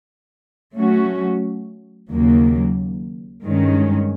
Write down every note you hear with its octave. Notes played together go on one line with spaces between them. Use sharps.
F#3 A3 C#4 F#4
D#2 C#3 F#3 A#3
G2 D#3 G#3 C#4